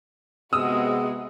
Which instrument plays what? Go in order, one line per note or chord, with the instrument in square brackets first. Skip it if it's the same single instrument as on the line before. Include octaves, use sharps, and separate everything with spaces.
[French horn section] C3 B3 [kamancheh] G#3 F#4 [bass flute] G#4 [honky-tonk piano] D#6 E6